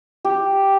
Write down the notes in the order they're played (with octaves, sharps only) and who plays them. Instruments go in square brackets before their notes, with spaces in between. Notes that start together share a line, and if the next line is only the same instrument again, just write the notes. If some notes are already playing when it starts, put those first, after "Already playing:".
[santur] G4